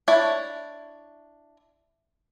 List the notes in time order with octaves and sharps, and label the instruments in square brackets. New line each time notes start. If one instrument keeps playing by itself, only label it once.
[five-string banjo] D4 E4 C#5